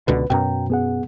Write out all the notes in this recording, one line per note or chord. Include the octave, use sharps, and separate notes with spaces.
C#2 B2 D3 B4
F#2 B2 G5 A#5
B3 G#4 F#5